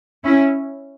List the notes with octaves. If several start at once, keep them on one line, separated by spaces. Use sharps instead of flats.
C#4 E4